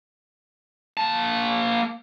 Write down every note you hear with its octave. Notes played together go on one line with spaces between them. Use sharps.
A#3 A5